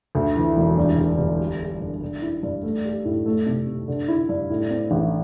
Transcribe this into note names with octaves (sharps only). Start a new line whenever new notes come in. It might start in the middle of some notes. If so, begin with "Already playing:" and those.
D2
E3
E1
G2
G1
G1
G3
G4
G2
D3
E4
G2
A3
G4
A2
A3
C3
C3
D3
E4
G2
A2
C4
A1